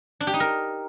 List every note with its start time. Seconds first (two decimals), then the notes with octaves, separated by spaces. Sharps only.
0.20 D4
0.27 G4
0.34 D#4
0.40 A#4